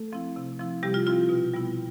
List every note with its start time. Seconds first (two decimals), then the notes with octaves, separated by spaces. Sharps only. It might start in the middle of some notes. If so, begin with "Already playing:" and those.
Already playing: A3 A4
0.12 F3 C4 E4
0.36 C3
0.59 F3 C4 E4
0.83 C3 G3 G4
0.94 F4
1.06 F3 C4 E4 F4
1.29 B2
1.54 G3 B3 E4